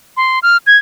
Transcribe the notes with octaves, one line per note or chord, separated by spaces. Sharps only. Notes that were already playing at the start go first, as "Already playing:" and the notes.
C6
F6
G#6